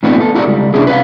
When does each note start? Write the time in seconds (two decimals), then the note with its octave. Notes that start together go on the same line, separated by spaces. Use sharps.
0.03 A2 E3 B3 C4 D4 F#4
0.19 B3 A4
0.35 D#4 E4 F#4 G4 A4 D5
0.47 C#2 G3
0.74 C3 B3 C#4 D4 E4 G#4
0.87 B4 C#5 D#5 F5 F#5